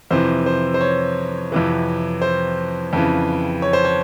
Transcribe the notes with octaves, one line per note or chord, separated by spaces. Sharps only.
F2 C3 E3 C5
C5
C5
C#5
F2 C3 E3
C5
F2 C#3 E3
C#5
C5
C#5